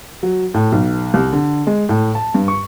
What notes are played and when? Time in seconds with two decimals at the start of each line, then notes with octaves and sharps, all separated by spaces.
0.23 F#3
0.54 A2
0.72 B1
1.14 C2
1.32 D3
1.67 G#3
1.89 A2
2.15 A5
2.34 G2
2.48 C#6